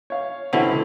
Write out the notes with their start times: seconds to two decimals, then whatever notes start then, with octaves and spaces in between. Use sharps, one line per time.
0.10 C#5 F5
0.53 D3 E3 C4 C#4 F#4
0.66 C#2